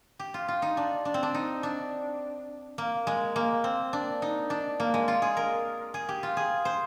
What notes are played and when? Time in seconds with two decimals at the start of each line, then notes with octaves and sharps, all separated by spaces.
0.19 G4
0.34 F4
0.48 F4
0.62 D#4
0.77 D4
1.05 D4
1.14 C4
1.23 D4
1.35 D#4
1.63 D4
2.78 A#3
3.07 G#3
3.36 A#3
3.64 C4
3.93 D4
4.22 D#4
4.50 D4
4.80 A#3
4.94 G#3
5.08 F4
5.22 G#4
5.37 A#4
5.94 G#4
6.09 G4
6.23 F4
6.37 G#4
6.65 C5